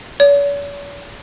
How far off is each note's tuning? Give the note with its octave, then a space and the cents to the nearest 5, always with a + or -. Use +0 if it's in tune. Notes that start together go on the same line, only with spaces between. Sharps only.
C#5 +45